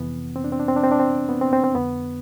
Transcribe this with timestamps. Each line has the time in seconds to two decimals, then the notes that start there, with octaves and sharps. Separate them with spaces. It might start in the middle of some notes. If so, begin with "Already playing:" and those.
Already playing: F2 C3 E3 B3
0.36 C4
0.44 D4
0.52 C4
0.60 D4
0.68 C4
0.76 D4
0.84 C4
0.91 D4
1.00 C4
1.29 B3
1.41 C4
1.53 C4
1.64 C4
1.75 F2 D3 B3